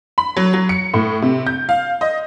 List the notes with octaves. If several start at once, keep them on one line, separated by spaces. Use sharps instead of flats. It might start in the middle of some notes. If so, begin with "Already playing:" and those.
B5
F#3
F#3
C#7
A2
C3
G6
F5
D#5